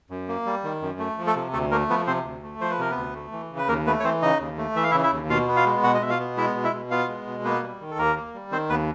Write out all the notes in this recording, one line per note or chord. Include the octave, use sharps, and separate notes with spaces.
F#2
A#3
G3
D#3
F#2
A3
F3
A3 A4
C3
D2 A3 A4
A3 A#3 A#4
F3 B3 B4
C3 C4 C5
D2
A3
F3 C5
B4
C3 A#4
B3 B4
D2
A3
E3
C#3
B4
D#2 A#3 A#4
A3 B3 B4
C#5
E3 C4 C5
C#3 D#4 D#5
D#2
A3
E3 E5
F5
C#3 E4 E5
E4 E5
D#2
B2 F4 F5
B3
F4 F5
G#3
B2 F#4 F#5
D#5
B2 E5
F4 F5
B3
G#3 E4 E5
B2
E4 E5
B2
B3 F4 F5
G#3
B2
A#3 B3 B4
G3
D#3
A4
D#2 A#3 A#4
A#3
G3
D#3 C4 C5
D#2 B3 B4